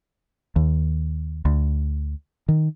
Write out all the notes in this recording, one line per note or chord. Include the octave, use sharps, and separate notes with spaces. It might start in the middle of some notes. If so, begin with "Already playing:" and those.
D#2
D2
D#3